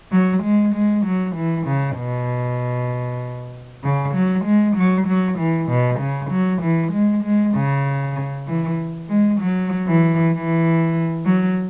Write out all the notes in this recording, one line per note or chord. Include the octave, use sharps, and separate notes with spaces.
F#3
G#3
G#3
F#3
E3
C#3
B2
C#3
F#3
G#3
F#3
F#3
E3
B2
C#3
F#3
E3
G#3
G#3
C#3
E3
G#3
F#3
E3
E3
F#3